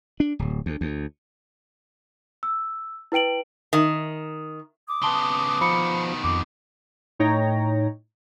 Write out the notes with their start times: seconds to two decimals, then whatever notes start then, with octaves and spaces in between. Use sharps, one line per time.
0.20 D4
0.39 D1
0.66 D2
0.81 D2
2.43 E6
3.12 E4 B4 G5 D7 F#7
3.73 D#3
4.88 D6 D#6
5.02 C#3 B3 A5 C6 G7
5.61 B2 D#3 F3 B5 C#7
6.24 F2 D6
7.19 A2 D#4 C#5 G5 A#5 A#6